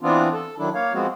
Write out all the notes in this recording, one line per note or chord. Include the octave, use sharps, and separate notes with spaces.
E3 B3 C4 D4 F4
A4
D#3 F#3 D4 E4
A#3 C#5 F5
F3 G#3 B3 C4 F#4